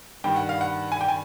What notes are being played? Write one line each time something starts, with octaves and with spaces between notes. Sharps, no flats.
G2 D#3 G3 G5
F#5
F5
F#5
G#5
G5
G#5